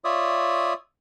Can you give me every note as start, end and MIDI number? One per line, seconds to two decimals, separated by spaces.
0.04 0.74 65
0.04 0.74 73
0.04 0.74 74
0.04 0.74 76
0.04 0.74 87